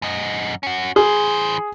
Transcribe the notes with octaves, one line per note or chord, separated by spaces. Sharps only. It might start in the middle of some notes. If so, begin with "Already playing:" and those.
F#2 D#5
C#4 F#4
E3 G#4 C5